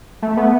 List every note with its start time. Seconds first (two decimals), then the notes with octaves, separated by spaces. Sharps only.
0.22 A3
0.37 B3